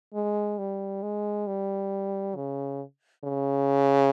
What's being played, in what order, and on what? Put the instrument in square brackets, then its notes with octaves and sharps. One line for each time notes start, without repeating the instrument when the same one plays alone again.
[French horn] G#3
G3
G#3
G3
C#3
C#3